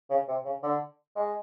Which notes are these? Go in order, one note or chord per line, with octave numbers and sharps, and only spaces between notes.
C#3
C3
C#3
D3
G#3